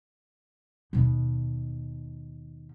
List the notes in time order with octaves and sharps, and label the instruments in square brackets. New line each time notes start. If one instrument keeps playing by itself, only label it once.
[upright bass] D#2 B2